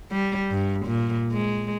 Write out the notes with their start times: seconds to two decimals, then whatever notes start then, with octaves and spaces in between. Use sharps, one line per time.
0.12 G3
0.51 G2
0.86 A#2
1.32 G#3